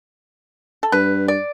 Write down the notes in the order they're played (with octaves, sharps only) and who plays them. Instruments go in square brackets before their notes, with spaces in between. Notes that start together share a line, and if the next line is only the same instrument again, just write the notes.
[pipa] A4
[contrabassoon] G2 [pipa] B4
[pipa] D5